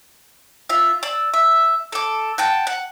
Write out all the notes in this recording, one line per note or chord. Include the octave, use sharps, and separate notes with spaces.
F4 E5
D5 E6
E5
A4 D6
F#5 G5 A5
F#5